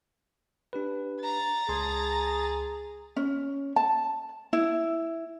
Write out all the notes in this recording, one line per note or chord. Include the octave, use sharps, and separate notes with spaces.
D4 G4 B4
A#5 A6
C#2 G#4 A5 C6
C#4
A5
E4